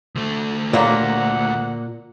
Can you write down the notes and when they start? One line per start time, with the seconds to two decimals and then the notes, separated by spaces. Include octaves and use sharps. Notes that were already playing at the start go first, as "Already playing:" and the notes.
0.15 D2 A3
0.73 A#2 F#3 G3 A#3 F#5